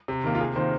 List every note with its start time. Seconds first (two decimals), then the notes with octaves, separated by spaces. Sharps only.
0.08 C3
0.24 D#3 A#3
0.35 F4
0.41 C3 G#4
0.56 D#3 C5
0.60 A#3